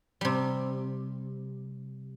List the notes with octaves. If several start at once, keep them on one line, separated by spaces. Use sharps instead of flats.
C3 G3